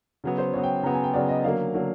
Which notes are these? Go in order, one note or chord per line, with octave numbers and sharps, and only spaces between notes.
C#3 F#3 B3
C5
C#3 F#3 B3 C#5
G5
C#3 F#3 B3 A#5
G#5
G5
C#3 F#3 B3 D5
D#5
D3 F#3 A#3 F5
D3 F#3 A#3